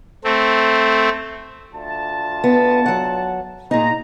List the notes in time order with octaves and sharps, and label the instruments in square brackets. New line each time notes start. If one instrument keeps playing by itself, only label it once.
[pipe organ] A3 C4
[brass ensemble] D2 F4 A5
[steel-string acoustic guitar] B3
F#3 F#5
[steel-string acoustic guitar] A#2 D#4 [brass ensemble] G#4 A#5